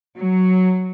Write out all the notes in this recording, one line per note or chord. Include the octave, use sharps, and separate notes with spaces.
F#3